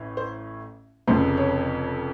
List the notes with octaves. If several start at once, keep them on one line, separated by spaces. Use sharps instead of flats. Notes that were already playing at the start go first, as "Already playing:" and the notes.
Already playing: A1 A2 E3
C5
F1 F2 C#3 C5
C#5